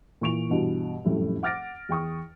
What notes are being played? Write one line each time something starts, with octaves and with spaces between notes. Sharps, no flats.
A#2 E3 C#6 D7 F7
G2 B2 E3
F1 F#2 A2 G3 E4
F#5 D6 F6 A6 A#6 D7
E2 G5 C#6 D#6